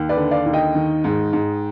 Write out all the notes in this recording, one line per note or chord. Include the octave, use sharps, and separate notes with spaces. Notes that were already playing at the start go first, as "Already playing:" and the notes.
Already playing: D#2
B4 D5
D3
D5 F5
D#2
D#5 G5
D#3
G#2
G#2